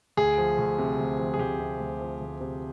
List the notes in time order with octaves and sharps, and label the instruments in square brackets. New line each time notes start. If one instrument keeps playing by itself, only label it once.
[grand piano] D2 G#4
F3
D2
C3
D2
F3
G#4
D2 G4
C3
D2
F3
D2
C3